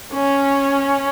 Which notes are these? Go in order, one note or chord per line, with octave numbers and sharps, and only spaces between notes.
C#4